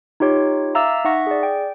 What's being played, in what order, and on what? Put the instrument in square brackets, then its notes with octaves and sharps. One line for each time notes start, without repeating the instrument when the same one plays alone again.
[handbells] D#4 F4 G4 C#5
E5 F5 A#5 D6 E6 A6
D#4 E5 F#5 C#6 A#6
G#4 D5
G5